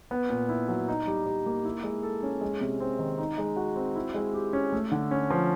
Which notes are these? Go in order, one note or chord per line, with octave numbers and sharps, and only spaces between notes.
B3
A#2
E4
F#3
D#4
G3
G3
A#3
E4
G#3
A4
C#4
G#3
C3
C4
D#3
D#4
G#3
F#4
C4
E4
G#3
G4
C#4
A3
D3
C#4
F3